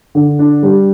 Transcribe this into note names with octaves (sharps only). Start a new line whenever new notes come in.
D3
D4
G3